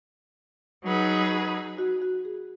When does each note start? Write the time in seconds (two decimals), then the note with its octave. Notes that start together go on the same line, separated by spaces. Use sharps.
0.84 F#3 D#4 G#4 B4
1.78 F#4
2.02 F#4
2.25 G#4